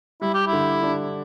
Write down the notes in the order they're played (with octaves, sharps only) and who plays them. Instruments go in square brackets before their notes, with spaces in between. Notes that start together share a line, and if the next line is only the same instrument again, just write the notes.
[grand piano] G3 [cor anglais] E4
[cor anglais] G4
E4
[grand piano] D3
D4